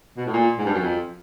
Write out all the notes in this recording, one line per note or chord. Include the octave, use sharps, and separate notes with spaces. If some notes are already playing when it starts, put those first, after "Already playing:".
B2
A2
A#2
G#2
G2
F#2
F2